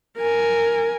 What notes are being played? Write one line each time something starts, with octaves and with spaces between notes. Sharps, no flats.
A#4 G#5